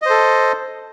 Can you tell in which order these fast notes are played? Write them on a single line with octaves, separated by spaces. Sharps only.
D#5 C5 A4